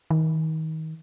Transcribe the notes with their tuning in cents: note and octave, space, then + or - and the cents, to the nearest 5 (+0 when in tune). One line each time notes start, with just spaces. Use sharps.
D#3 +30